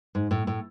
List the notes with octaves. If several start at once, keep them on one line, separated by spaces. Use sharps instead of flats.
G#2
A2
A2